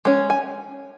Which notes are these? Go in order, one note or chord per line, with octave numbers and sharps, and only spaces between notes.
G#3 C#4
G#5